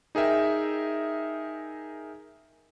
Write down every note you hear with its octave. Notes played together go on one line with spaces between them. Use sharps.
D#4 G#4 A#4 E5 G5